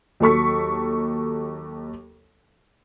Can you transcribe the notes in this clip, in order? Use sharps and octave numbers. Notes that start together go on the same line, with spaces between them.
D#2 F#3 A4 C#6 B6